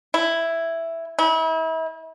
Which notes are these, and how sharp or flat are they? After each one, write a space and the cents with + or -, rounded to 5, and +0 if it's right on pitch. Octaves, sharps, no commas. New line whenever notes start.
E4 +5
E4 -35